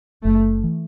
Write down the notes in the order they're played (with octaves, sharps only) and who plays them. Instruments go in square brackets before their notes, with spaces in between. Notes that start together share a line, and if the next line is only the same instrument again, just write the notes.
[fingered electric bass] F#1 [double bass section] A3
[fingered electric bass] E3